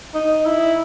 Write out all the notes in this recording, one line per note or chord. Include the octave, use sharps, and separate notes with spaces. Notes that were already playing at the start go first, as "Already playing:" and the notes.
D#4
E4